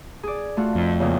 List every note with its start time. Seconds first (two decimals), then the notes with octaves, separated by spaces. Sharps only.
0.23 G#4 D5
0.57 A3 F4 F#4
0.75 F2
0.99 E2 A#2 C#3